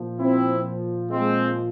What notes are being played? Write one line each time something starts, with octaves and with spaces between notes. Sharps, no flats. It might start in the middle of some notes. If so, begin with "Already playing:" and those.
Already playing: A#2 F3
C4 E4
G#3 C4